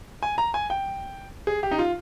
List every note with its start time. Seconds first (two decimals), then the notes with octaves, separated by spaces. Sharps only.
0.23 G#5
0.38 A#5
0.54 G#5
0.70 G5
1.47 G#4
1.63 G4
1.71 D#4
1.79 F4